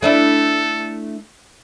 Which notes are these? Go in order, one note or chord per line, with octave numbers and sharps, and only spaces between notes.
A3 D4 E4 A4